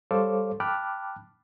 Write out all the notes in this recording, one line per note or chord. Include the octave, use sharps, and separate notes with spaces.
G3 A4 C5 C#5 F5 D6
G5 A5 B5 D6 F6 F#6